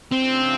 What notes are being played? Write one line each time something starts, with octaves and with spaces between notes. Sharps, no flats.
C#3 F3 A3 C4 D4 F4